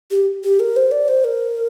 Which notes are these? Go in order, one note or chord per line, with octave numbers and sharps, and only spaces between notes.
G4
G4
A#4
C5
D5
C5
A#4